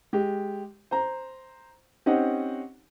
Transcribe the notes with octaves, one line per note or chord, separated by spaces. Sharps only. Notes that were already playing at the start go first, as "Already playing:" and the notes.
G#3 G4
C5 A#5
C4 C#4 D#4 G4 D#5 F#5